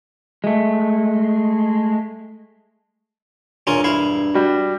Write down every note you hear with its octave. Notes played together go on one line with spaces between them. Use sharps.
G#3 A3
E1 G2 C#4 F4 A#4
E4 F5
G3 F#4